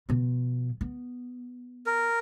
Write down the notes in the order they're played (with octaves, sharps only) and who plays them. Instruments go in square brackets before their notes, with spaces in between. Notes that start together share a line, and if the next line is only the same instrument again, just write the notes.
[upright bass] B2 F3
B3
[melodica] A#4